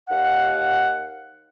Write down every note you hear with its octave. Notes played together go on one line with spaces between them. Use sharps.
D#2 F5 F#5